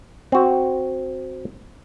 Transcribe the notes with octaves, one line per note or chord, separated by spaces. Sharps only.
C4 F#4